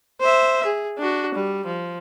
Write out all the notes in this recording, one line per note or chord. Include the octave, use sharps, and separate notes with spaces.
C5 E5
G#4
D4 F#4
G3
F3